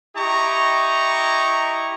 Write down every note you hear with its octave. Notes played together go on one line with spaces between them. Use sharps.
E4 G4 D#5 A#5 C#6